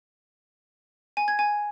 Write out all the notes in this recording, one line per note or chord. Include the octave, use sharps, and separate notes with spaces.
G#5
G#6
G#5